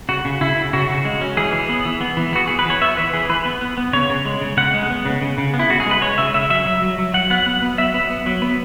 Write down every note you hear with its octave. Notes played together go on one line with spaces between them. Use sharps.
C#3 F#4
C#3
C#3 E4
C#3
C#3 F#4
C#3
G#3
C#4
E3 G#4
E3
B3
E3
B3
E3
B3 F#4
E3 G#4
B4
E3 C#5
B3 E5
E3 B4
E3 G#4
E3 B4
B3
B3
B3
C#3 C#5
C#3
G#3
C#3
C#3 F#5
G#3
B3
C#3
C#3
C#3
B3
E4
C#3 F#4
G#4
G#3 B4
G#3 C#5
C#3 E5
C#3 E5
F#3 E5
F#3
F#3
F#3
F#3 F#5
B3 F#5
B3
B3
F#3 E5
B3
B3
F#3
B3